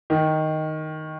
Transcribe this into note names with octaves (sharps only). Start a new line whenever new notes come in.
D#3